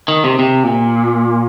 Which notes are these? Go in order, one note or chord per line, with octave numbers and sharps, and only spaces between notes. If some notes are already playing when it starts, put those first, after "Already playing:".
D#3
C3
C3
A#2